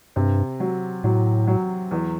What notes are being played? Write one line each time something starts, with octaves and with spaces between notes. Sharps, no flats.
G2 C3
F#3
A2 F#3
F#3
E2